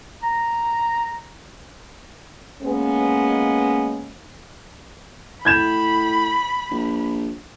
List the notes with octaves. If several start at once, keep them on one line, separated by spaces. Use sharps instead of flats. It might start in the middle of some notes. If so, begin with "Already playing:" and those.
A#5
G#3 A#3 B3 C#4
A2 B5 G6 G#6 E7
A#1